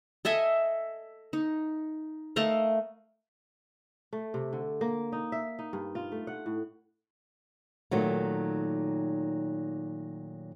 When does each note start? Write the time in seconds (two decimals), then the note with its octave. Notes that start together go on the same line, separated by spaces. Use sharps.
0.25 A4 D#5 E5 G#5
1.33 D#4
2.36 A3 A#4 D#5 F5
4.13 A3
4.34 C3
4.53 D3
4.81 A#3
5.12 D#4
5.32 E5
5.59 D#4
5.73 G2
5.95 F4
6.12 A3
6.27 F#5
6.46 A2
7.91 A#2 D#3 F#3 A3